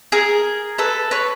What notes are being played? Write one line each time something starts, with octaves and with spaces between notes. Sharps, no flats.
G#4 A#4
A4 B4
B4 C#5